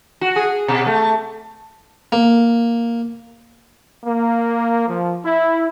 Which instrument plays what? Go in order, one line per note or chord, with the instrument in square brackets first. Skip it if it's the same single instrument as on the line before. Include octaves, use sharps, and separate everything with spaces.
[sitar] F#4
G#4
B2
A3
[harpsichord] A#3
[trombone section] A#3
F3
E4